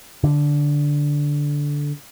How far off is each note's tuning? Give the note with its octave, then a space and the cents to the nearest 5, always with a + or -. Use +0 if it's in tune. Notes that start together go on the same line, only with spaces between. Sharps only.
D3 -10